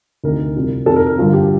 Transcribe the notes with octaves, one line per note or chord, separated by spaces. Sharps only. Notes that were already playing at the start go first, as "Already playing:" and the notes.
D2 C3 D#3 A#4
C2 C3 F3
F2 C3 D#3 A4
A#4
A#4
G2 D3 F3
G4